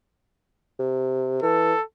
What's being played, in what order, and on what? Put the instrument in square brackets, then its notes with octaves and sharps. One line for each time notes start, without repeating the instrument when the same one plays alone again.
[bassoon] C3
[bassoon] E3 [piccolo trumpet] A4